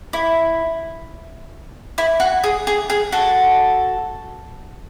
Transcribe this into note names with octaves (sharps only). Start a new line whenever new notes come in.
E4
E4
F#4
G#4
G#4
G#4
F#4 A4